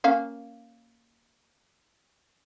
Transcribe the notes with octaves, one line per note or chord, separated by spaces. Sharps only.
A#3 C#4 F5